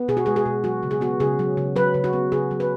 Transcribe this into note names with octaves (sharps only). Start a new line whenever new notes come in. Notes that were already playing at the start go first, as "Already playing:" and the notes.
Already playing: B3
B2 G#4
F#4
G#3 G#4
G#4
B2
F#3 F#4
C#3
G#4
B3 F#4
C#3 G#4
F#3
C#3
F#3 B4
C#3
F#4
B3
C#3 G#4
F#3
B4